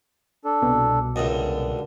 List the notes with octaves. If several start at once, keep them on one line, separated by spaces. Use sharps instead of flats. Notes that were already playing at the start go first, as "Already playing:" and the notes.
D4 A4
C2 B2
C#2 F#2 D#5
D3